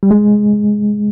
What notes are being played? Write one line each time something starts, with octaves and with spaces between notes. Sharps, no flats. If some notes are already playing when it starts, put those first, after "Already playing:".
G3
G#3